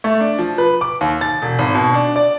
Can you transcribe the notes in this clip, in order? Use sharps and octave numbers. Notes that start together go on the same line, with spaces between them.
A3
D4
F3
B4
D6
D#2
A6
E1
G#1
B2
D4
D5